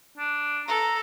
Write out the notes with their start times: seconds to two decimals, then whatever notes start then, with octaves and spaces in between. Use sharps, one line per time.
0.18 D4
0.67 A4 A#5